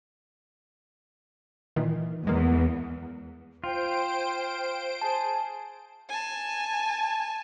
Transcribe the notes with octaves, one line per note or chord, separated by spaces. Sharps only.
A#2 D#3 E3
E2 G#3 A#3
F4 C5 G5 D7
G#4 A5
G#5 A5